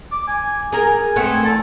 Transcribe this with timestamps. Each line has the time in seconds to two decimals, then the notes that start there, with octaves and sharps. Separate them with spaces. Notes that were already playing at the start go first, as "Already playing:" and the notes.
0.12 D6
0.28 G#5
0.72 G#4 A#4 G#5
1.16 A3 B3 C4
1.45 E2 A5